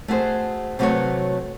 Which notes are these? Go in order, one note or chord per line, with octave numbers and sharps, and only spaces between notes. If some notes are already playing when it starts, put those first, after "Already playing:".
A3 F#4 G#4 C5
C3 F#3 A3 F#4 B4 C#5